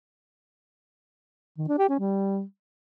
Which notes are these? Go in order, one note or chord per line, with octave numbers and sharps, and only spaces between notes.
D#3
D4
G4
C#4
G3